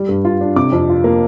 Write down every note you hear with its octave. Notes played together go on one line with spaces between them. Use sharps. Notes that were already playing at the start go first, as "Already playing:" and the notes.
Already playing: G3
G2
F4
D4
C3 D6
F2
F4
A#3